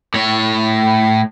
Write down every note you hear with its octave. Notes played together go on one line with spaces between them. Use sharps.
A2 C#5